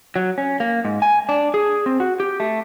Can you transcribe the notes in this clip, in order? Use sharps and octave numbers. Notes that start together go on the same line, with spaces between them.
F#3
C#4
A#3
G#2
G#5
D4
G#4
C4
F#4
G4
A3